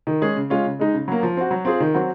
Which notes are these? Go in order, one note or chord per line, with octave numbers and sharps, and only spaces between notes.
D#3
G#3 C#4 G#4
C#3
G#3 C#4 F4
C#3
G#3 D#4
C#3
F#3 A#3
F3
C4 F#4
F#3
C4 F4 G#4
D#3
F#3 C4 F#4